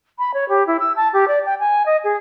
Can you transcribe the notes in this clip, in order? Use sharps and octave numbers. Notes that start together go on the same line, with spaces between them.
B5
C#5
G4
E4
E6
A5
G4
D5
G5
G#5
D#5
G#4